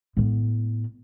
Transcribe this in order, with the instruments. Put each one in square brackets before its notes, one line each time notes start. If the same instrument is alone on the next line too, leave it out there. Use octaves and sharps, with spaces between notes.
[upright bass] A2 B3